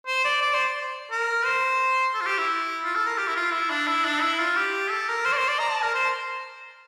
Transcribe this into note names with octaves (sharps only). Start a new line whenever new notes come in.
C5
D5
D5
C5
A#4
C5
A4
F4
G4
E4
F4
A4
A#4
G4
E4
F4
E4
D4
E4
D4
E4
F4
G4
A4
A#4
C5
D5
C5
D5
A#5
A5
A#4
C5